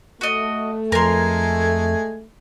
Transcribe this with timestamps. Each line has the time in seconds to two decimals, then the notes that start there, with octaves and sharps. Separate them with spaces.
0.21 A3 F#4 D#5
0.92 F2 G#3 A#4 G#5 C6